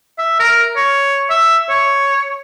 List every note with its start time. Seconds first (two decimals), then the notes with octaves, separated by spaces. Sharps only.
0.19 E5
0.40 A#4
0.76 C#5
1.30 E5
1.69 C#5